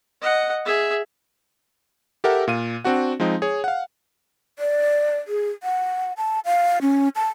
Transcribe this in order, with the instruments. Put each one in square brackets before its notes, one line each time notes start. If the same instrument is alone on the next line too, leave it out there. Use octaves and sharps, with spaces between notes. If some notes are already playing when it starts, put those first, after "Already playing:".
[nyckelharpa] D#5 F#5
G#4 E5
[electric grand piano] G4 A4 A#4 E5 F#5
A#2 F5 D#7
C4 D4 F#4 F#5
F3 G#3 C4 D#4
G#4 C#5
F5 F#5
[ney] D5
G#4
F#5
A5
F5
C#4
A5